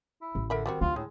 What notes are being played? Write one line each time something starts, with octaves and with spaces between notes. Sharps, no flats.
E4
A1
D3 A#4 E5 B5
D#3 G3 C4 F#4
D2 D3 F4
A2 G#3